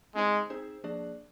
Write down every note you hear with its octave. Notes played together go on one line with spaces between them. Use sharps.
G#3 C4 D#4 G#4 C5
C4 D#4 G#4 C5
F3 A#3 D4 G#4 D5